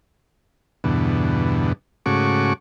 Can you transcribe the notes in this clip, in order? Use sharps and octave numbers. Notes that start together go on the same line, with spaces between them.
E2 G2 B2 D3
G#2 C#3 A3 F#4 C#6 D6